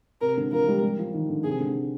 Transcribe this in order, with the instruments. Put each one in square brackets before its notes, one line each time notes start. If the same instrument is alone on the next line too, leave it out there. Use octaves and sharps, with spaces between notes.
[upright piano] C3 [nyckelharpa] A#4
[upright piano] D3
[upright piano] F3 [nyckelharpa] A#4
[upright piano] G3
G3
F3
D#3
D3
[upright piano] C3 [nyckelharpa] G#4
[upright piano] D3